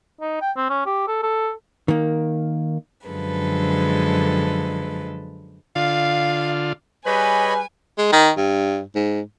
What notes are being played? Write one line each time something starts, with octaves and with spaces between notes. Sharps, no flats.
D#4
G5
C4
C#4
G4
A4
A4
D#3 A#3
F#2 D3 F3 G#3 A4 B4
D3 F4 F5
G3 G#4 B4 C#5 D#5 G#5 B5
G#3
D#3
G2
G#2